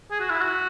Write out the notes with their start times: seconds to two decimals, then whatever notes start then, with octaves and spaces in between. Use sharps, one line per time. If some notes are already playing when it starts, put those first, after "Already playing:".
0.11 G#4
0.20 F#4
0.30 E4
0.41 F#4